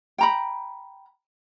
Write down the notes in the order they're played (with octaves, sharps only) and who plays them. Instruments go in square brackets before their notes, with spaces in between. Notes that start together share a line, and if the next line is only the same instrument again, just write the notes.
[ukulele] G5 A#5 B5